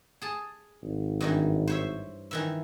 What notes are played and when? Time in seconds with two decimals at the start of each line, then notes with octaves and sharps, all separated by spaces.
0.22 G#4 A5
0.82 G#1
1.21 G2 D#3 E3
1.67 C5 C#5 E5
2.31 D#3 E3 E5